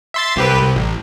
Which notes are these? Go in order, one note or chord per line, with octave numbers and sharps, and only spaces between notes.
E5 C6 A6
C2 G4 B4
C2
A1